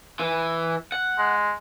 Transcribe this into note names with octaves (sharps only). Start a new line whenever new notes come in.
E3
F#5
G#3